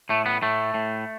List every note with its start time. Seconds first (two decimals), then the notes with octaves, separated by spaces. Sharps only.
0.09 A2 A3
0.26 B3
0.42 A2 A3
0.74 A2